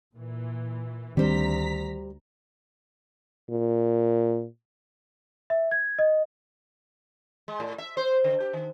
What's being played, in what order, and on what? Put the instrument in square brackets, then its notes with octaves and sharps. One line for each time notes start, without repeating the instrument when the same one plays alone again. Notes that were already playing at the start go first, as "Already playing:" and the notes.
[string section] A#2 E3
[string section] D2 A#5 B6 [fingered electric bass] D#3 C4 D4 [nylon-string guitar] G3 C5
[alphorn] A#2
[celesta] E5
G#6
D#5
[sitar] G#3
A2
E5
C5
D3
G4
D#3